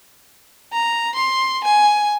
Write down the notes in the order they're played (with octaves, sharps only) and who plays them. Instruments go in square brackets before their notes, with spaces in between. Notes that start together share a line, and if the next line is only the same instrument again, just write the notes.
[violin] A#5
C6
G#5